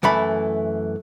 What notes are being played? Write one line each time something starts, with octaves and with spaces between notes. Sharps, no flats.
F#2 E3 A3 B5